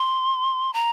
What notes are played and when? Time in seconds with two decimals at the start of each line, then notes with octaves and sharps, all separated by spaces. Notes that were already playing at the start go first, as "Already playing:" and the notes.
Already playing: C6
0.73 A#5